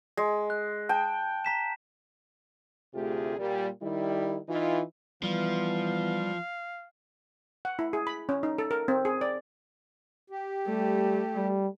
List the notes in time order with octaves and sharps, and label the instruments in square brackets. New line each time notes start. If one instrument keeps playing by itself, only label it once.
[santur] G#3
[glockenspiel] F#6
[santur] G5 [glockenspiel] A5
[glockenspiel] A#5 B6 E7
[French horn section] D2 C3 A3 F4 G4 G#4
A#2 G3
D#3 G3 E4
E3 D#4 F4
[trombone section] E3 B3 [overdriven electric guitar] F3 [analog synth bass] G3 [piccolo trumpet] F5
[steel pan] F#5
E4
G#4
B5
C#4
D#4
A4
A#4
C4
G#4
D5
[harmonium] G4
[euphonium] G3 [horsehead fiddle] A3
[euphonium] G3